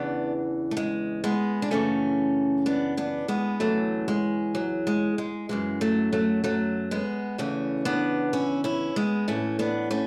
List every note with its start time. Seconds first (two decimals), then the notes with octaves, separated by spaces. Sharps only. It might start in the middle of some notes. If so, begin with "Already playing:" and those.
Already playing: E2 C#3 E3 B3 D4
0.71 A3
0.77 G#3
1.24 G#3 B3
1.62 D4
1.71 F#2 C#3 E3 A3 C#4
2.66 B3 D4
2.97 B3 D4
3.28 G#3 B3
3.60 E2 C#3 E3 F#3 A3
4.08 G#3
4.55 F#3
4.87 G#3
5.18 G#3
5.49 F#2 C#3 E3 G#3
5.81 F#3 A3
6.13 F#3 A3
6.44 F#3 A3
6.91 G#3 B3
7.38 E2 C#3 E3 A3 C#4
7.85 B3 D4
8.33 C#4 E4
8.64 C#4 E4
8.96 G#3 B3
9.28 A2 E3 A3 C#4
9.59 B3 D4
9.91 A3 C#4